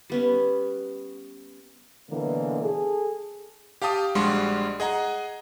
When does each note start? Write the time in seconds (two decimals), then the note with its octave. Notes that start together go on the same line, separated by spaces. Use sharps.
0.10 G3 B3 C#4
2.10 B2 D3 E3 F#3 A#3
2.62 G#4 A4
3.82 G4 F5 G5 A5 D#6
4.15 A#1 G3 G#3 D4 F#4 C6
4.80 G#4 D#5 F#5 A#5